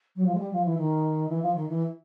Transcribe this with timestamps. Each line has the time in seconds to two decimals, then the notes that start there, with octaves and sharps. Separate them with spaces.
0.16 F#3
0.26 F3
0.35 G#3
0.39 G3
0.53 F3
0.65 E3
0.78 D#3
1.29 E3
1.43 F3
1.55 D#3
1.69 E3